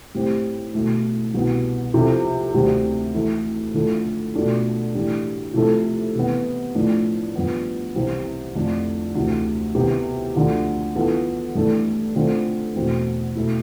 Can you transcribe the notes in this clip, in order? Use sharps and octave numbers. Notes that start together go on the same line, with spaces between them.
A2 G3 C4 G4
B2 A3 E4
C2 B2 B3
C3 F3 C4 E4 A4
D2 C3 G3 C4 G4
E3 A3 E4 A4
D3 F3 A3 E4 A4
B2 A3 D4 F4 A4
A2 E3 G3 D4
C3 F3 A3 E4 A4
C3 E3 B3
A2 F3 A3 D4
G2 F3 B3
C2 C3 E3 G3 C4
F2 D3 A3 D4 F4
D2 C3 E3
C3 G3 B3 E4 G4
D2 D3 F3
E3 B3 F4 A4
G2 E3 A3 D4 A4
D3 A3 C4 F4 A4
E2 B2 A3 C4
B2 A3 E4 A4